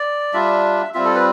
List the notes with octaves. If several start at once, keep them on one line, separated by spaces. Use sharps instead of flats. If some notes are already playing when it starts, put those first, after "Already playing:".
Already playing: D5
G3 D4 F4 E5
G3 C4 F4 E5
A4
B4